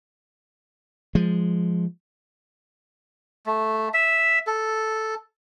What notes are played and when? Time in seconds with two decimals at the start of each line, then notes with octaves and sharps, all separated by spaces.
1.15 F3 G#3
3.46 A3
3.94 E5
4.47 A4